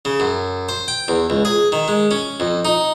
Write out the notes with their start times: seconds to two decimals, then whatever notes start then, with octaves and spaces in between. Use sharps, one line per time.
0.05 C#3
0.20 F#2
0.69 C5
0.88 G5
1.08 E2
1.30 C#2
1.45 G#4
1.72 D#3
1.88 G#3
2.11 C#4
2.40 F2
2.65 D#4